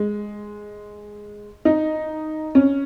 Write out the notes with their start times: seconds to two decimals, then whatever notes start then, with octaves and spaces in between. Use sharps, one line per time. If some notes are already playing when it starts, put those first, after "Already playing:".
Already playing: G#3
1.65 D#4
2.55 C#4